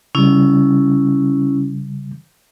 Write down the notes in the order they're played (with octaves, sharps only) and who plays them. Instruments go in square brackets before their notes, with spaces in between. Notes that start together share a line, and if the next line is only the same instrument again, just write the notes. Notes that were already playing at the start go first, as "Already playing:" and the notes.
[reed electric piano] C#3 G3 [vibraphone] C#4 E4